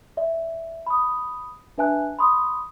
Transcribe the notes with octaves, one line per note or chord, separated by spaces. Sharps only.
D5 E5
B5 D#6
D4 B4 E5 G#5 A5 F#6
B5 C6 D#6